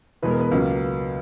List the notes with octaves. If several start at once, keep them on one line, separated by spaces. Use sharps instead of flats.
E2 B2 G#3 B3 B4
A#4
B3 B4
C#2 C#3 F#3 A#3